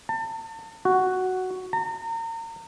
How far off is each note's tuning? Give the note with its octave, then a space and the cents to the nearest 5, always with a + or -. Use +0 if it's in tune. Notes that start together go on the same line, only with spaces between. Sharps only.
A5 +35
F#4 +5
A#5 -35